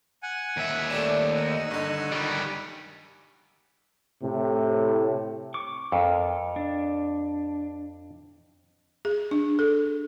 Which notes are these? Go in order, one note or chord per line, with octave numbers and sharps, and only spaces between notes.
F#5 G#5
D#2 E5
A3 G4 D5 E7
D#4 F#5 G#5 E6
G2 D3
D#3 G3
A2 C3
C#6 D6
F2 A4 A#4
D4
G#4
D4
A4